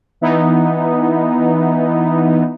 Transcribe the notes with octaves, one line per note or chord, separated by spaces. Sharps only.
E3 B3 D#4